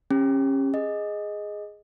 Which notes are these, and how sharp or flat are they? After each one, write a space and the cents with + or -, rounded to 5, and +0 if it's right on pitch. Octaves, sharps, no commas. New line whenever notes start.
C#4 -30 G4 +30
G#4 +0 D#5 +0